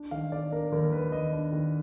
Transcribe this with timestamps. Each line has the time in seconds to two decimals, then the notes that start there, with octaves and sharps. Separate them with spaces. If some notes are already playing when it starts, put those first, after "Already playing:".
Already playing: D4
0.11 D#3 F5
0.32 D#3 D5
0.52 D4 A#4
0.72 D#2 A#4
0.92 D#3 B4
1.12 D#2 D#5
1.33 D4
1.52 D#3